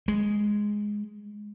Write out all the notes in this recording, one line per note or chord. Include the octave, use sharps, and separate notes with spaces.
G#3